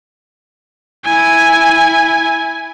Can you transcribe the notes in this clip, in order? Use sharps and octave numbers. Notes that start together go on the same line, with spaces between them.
E4 G#5